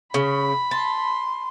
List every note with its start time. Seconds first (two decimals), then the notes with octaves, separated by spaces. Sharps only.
0.14 C#3 B5
0.71 A5 C6